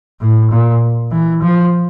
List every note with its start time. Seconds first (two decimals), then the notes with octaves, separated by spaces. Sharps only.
0.21 A2
0.51 A#2
1.11 E3
1.42 F3